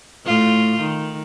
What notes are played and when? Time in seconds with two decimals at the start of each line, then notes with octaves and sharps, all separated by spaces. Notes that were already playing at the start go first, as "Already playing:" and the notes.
0.25 A2 A3 F4
0.80 D#3